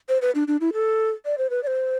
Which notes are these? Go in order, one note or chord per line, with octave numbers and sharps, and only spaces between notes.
C5
B4
D4
D4
E4
A4
D5
C5
B4
D5
C5